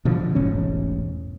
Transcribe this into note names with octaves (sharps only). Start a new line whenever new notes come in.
B2 D3 F3
E1 A1 G#2 C#4